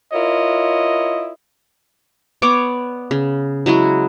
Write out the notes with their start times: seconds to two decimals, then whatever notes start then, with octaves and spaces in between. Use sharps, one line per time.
0.12 E4 F4 A#4 C#5 D#5
2.42 B3 C#5 D5 D6
3.11 C#3
3.66 F#3 G#3 E4 F#4